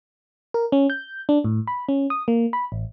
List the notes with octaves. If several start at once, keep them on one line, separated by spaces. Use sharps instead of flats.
A#4
C#4
G6
D4
A2
B5
C#4
D#6
A#3
B5
A1